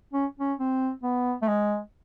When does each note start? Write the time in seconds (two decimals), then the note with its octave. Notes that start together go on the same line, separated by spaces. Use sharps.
0.13 C#4
0.40 C#4
0.59 C4
1.03 B3
1.42 A3
1.48 G#3